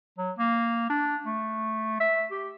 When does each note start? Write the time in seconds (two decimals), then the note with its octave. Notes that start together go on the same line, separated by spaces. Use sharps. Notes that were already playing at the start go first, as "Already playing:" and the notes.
0.18 F#3
0.39 A#3
0.90 D4
1.24 A3
2.00 E5
2.31 G4